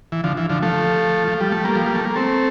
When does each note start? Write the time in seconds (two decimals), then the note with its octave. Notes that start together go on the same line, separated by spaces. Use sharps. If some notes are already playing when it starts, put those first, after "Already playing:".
0.12 E3
0.24 D3 F3
0.37 E3
0.49 D3 F3
0.63 F3 A3
1.28 F3
1.40 G3
1.52 A3
1.64 G3 A#3
1.75 F3
1.86 G3
1.95 A3
2.05 A#3
2.16 A3 C4